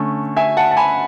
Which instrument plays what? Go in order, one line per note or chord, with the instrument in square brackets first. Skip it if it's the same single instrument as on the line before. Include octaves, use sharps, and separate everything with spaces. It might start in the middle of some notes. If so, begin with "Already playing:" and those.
Already playing: [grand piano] D3 A3 C#4
E5 G#5
F#5 A5
A5
G#5 B5